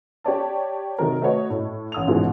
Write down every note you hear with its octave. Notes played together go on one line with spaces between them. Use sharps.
G4 C#5 D5 A5
C3 D#3 F#3 A#4
A3 F#4 B4 C#5 D#5
A2
A1 D#6 F7
A1 G#2 B2 E3 F3